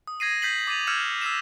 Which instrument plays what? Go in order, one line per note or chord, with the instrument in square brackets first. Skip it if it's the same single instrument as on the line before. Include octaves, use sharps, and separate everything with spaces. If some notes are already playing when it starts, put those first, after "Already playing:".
[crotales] D#6
G#6 A#6 C7 D#7
G6 B6 C7 F#7
D6 A6 D#7 F7
E6 F6 G6 G#6 C#7 E7
E6 A#6 C7 E7